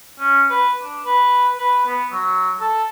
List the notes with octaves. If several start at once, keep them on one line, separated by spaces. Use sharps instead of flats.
C#4
B4
D4
B4
B4
B3
F#3
A4